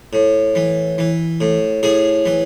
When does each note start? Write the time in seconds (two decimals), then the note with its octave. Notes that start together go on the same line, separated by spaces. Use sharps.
0.13 A2
0.55 E3
0.98 E3
1.41 A2
1.83 A2 G#4
2.26 E3